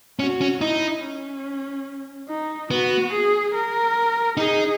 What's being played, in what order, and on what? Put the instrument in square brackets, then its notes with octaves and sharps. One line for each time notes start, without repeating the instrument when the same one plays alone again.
[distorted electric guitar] C#4 [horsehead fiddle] F#4
[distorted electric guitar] C#4
[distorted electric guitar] D#4 [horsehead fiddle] E4
[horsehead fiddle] C#4
D#4
[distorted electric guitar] B3 [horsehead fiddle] F#4
[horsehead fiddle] G#4
A#4
[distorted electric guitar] D#4 [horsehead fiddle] G#4